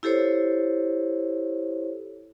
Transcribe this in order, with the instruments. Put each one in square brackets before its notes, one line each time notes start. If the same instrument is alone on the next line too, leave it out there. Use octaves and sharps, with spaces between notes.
[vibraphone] E4 G4 A4 C5 C#5